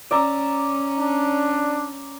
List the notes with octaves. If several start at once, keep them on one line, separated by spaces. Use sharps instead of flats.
C#4 D5 E5 A#5
D4